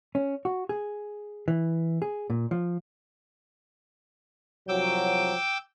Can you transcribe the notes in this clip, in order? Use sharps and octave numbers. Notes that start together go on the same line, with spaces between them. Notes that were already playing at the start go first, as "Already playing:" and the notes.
C#4
F#4
G#4
E3
G#4
A#2
F3
C2 F3 F#3 G5 D6 E6